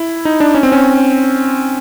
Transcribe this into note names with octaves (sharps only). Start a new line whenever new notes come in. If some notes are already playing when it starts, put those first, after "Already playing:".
Already playing: E4
D#4
D4
C#4
C4
C#4